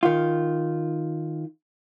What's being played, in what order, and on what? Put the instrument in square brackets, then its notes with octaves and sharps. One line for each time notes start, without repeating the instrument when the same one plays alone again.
[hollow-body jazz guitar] D#3 F4